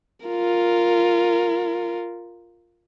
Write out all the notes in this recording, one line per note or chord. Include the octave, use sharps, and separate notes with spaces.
F4 A#4